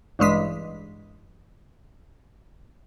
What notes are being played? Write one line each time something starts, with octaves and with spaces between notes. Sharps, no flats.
A1 G2 G#3 B6